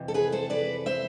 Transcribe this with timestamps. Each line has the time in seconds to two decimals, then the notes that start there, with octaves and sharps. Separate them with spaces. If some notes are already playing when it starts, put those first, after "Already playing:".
Already playing: F2 C3 E3
0.08 A4
0.14 G#4 B4
0.32 A4 C5
0.50 B4 D5
0.86 C5 E5